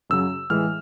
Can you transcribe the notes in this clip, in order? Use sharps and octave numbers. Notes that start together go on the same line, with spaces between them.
F#2 C#3 F#3 E6
A2 E3 G#3 F6